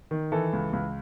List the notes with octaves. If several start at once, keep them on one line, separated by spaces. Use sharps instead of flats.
D#3
E3 A4
C#2
C#2